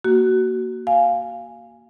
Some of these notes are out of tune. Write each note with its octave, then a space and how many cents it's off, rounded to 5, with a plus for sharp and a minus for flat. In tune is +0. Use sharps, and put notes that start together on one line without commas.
A#3 +0 F#4 +20
F5 +0 G#5 +0